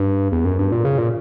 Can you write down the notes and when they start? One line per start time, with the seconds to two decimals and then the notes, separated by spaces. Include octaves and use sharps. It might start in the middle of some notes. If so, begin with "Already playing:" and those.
Already playing: G2
0.32 E2
0.45 F#2
0.59 G2
0.72 A#2
0.85 C#3
0.98 A#2